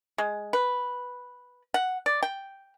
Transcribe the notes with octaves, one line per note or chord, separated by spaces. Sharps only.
G#3
B4
F#5
D5
G5